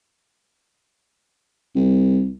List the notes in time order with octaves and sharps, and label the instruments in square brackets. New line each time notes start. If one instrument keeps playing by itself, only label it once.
[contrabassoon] C2